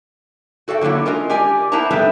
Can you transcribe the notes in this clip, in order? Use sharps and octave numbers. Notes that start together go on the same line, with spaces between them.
F#4 A4 D5 F5 G5
D3 F#3 G3 A#3 E4
G#3 C#4 F4 A#4 D#5
G4 A#4 D5 G#5
B3 E4 A#4 C5 A5 A#5
G#2 C3 G3 A3 B3 D4